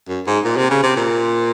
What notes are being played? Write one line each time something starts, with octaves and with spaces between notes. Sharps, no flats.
F#2
G#2
A#2
C3
C#3
C3
A#2